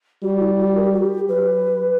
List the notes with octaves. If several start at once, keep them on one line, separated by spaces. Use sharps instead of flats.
G3 F#4
E4
F#4
A#4
G4
F#4
G4
F#3 B4